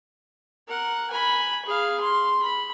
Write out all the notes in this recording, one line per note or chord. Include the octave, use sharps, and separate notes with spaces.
A#4 F#5
G#5 B5
G#4 F5
C6
B5